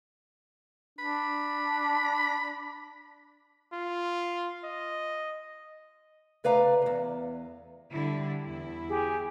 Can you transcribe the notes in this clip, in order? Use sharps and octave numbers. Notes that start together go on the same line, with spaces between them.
D4 B5
F4
D#5
C#3 A3 B4 D5 F5 A#5
E2 G#2
D3 G3 E4
E2 E4
G4 G#4